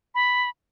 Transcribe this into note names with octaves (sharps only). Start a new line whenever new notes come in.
B5